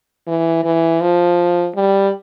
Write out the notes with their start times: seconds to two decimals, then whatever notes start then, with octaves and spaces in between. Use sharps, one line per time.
0.27 E3
0.64 E3
1.01 F3
1.75 G3